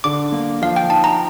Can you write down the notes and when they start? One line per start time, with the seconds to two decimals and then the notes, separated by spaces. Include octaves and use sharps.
0.04 D3 D6
0.32 A#3
0.62 F3 F5
0.76 G5
0.89 D#4 A5
1.04 A#5